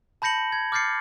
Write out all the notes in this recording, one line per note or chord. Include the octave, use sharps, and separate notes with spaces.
A5 B5 G6 A#6 C#7 F#7
G#6
D6 F6 G6 A6 C7 C#7